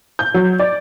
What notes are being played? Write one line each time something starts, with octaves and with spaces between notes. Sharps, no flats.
G6
F#3
D5